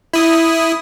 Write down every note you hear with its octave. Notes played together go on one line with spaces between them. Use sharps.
E4 D#6